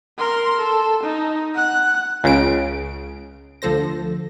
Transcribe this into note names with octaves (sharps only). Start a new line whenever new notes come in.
A#4 C6
A4
D#4
F#5 F#6
C#2 C#3 D7
D2 D3 F3 A4 C5 A#6